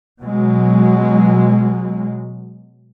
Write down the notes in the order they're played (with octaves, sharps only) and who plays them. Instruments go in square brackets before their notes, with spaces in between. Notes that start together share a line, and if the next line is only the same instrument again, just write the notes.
[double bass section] B2 F#3 G#3